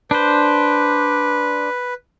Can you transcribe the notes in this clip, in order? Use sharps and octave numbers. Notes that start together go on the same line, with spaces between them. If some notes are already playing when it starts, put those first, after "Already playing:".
D4 B4 C5